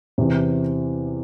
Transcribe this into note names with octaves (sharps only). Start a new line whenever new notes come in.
E2 C3 E3